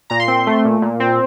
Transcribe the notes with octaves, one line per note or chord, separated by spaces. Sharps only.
A#2 A#5
C6
C4
A3
A#2
A#2
C4